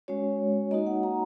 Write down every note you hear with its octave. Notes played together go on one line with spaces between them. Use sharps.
G#3 C#4 F#4 C#5
A#3 D#4 F#4 D#5
F#5
A#5